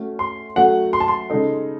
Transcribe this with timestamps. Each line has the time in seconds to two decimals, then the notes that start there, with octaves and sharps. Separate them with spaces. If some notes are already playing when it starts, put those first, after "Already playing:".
Already playing: A3 C#4 F#4
0.19 C6
0.56 F#3 A3 C#4 F#4 A4 F#5
0.93 C6
1.00 A5
1.08 C6
1.30 C#3 G#3 D#4 A4